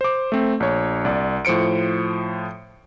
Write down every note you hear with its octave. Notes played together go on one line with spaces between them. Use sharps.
C5 D6
A3 C4
A#1 C#5
C2 D5
A2 F3 C5 C#7 D7